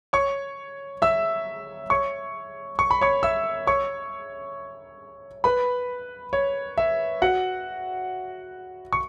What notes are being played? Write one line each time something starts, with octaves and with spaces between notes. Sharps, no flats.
C#5 C#6
E5 E6
C#5 C#6
C#6
B5
C#5 C#6
E5 E6
C#5 C#6
B4 B5
C#5
E5
F#4 F#5
C#6